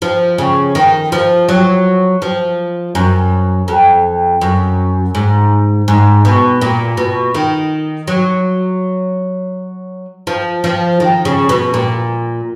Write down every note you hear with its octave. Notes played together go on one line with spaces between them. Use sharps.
F3
C#3
D#3
F3
F#3
F3
F#2
F2
F#2
G#2
G#2
B2
A#2
B2
D#3
F#3
F3
F3
D#3
C#3
B2
A#2